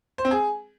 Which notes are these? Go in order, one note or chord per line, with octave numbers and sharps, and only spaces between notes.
C5
C4
G#4